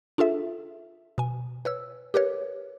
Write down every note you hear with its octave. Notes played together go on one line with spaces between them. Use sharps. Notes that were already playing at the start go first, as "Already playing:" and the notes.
D4 F4 G#4 A4 E5
B2 G#5
B4 C#5 E6
G4 A#4 B4 C#5